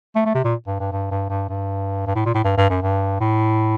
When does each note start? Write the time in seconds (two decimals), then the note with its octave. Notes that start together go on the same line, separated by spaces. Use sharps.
0.16 A3
0.26 A3
0.35 C3
0.44 A#2
0.67 G2
0.80 G2
0.92 G2
1.11 G2
1.30 G2
1.49 G2
2.07 G2
2.15 A2
2.25 A#2
2.35 A2
2.44 G2
2.57 G2
2.70 F#2
2.82 G2
3.20 A2